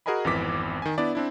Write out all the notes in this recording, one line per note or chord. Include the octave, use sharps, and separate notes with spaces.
F#4 G#4 A#4 D#5 G#5 B5
G#1 F2 E3 B3 D6 B6
D#3 G#5
B3 D4 E4 D5
C4 D4 E4